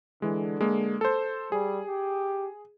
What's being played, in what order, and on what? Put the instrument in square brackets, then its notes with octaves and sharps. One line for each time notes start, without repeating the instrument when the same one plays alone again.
[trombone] D3 [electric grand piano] E3 G#3
[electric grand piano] G#3 A#3
A4 C5
[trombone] G3 [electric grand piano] G#4
[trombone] G4